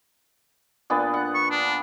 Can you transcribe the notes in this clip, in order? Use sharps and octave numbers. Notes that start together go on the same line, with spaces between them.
A#2 B3 D4
F#5
C#6
D4